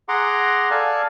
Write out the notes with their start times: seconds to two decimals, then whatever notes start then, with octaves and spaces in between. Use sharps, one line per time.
0.09 G#4 F#5 A#5 C6 D6
0.71 A4 D5 F5 G#5 A5